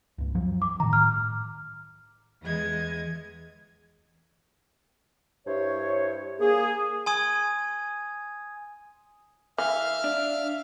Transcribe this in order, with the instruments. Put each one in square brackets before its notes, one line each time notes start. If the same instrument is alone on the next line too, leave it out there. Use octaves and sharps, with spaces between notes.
[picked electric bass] C#2 G2
F#2 F3 F#3
[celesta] D6
[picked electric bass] A2 D#3 [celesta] A#5
[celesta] F6
[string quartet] E2 E3 G#3 D#5 G#6
[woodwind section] G2 E4 C5 C#5
A#3 G#4
[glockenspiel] G#5 C6 D#6 G#6 D#7
[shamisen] E3 [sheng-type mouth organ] E5 F5 F6
[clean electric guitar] D4